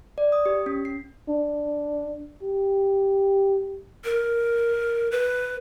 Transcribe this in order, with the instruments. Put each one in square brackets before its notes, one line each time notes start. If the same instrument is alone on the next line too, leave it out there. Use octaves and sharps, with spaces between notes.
[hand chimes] D5
D#6
G4
C#4
C7
[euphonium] D4
G4
[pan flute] A#4
B4